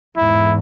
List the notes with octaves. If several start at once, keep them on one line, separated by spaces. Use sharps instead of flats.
E2 G#2 E4